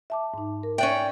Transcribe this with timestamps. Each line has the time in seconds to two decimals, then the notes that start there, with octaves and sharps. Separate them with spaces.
0.10 E5 A5 D6
0.34 G#2 D#4
0.63 A#4
0.78 C#4 D5 E5 G5 F#6